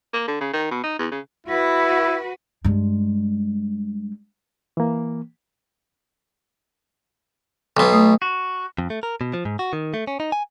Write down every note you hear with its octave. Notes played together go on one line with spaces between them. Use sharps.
A#3
D3
C#3
D#3
B2
D#4
E2
C#3
E4 F#4 B4
G2 G#3
E3 A#3
B1 B2
A3 D#6
F#4
F2
A3
A#4
B2
F3
G#2
F#4
D#3
A3
C#4
D#4
G#5